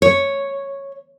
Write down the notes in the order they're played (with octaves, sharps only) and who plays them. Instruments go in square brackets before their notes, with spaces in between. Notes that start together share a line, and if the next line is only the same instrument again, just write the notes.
[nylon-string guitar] C#5